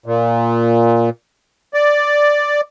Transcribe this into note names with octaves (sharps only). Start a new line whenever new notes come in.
A#2
D5